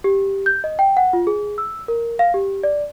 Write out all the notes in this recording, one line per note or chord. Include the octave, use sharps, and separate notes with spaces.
G4
G6
D#5
G5
F#5
F4
G#4
E6
A#4
F5
G4
D5